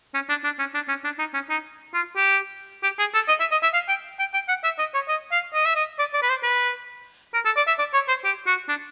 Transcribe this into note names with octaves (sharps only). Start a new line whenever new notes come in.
C#4
D4
D4
C#4
D4
C#4
D4
D#4
C#4
D#4
F4
G4
G4
G#4
A4
D#5
E5
D#5
E5
F5
G5
G5
G5
F#5
E5
D#5
C#5
D#5
F5
D#5
E5
D#5
D5
D5
B4
C5
B4
A#4
A4
D5
E5
D5
C#5
C5
G4
F#4
D4